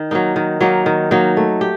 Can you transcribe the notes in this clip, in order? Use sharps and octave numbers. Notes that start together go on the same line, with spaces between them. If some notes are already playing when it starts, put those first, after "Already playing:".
Already playing: D#3
F#3 A#3 D#4
D#3
F#3 A#3 D#4
D#3
F#3 A#3 D#4
A3
G4